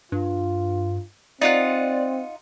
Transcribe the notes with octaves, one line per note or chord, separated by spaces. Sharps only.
G2 F4
C4 D#4 F4 D5 F#5